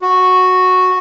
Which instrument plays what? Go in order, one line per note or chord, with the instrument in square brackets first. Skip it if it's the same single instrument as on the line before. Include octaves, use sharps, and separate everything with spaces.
[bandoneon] F#4